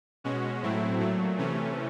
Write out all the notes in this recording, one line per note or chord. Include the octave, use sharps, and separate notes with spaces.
B2 G#3 C#4 F#4
A2 F#3 A3 C4 E4
A#2 F#3 A3
C3 E3 A3 C#4